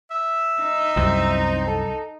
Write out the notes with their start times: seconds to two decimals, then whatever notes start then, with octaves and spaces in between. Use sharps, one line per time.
0.11 E5
0.62 D#4
0.96 C2 F#2 C4
1.67 A4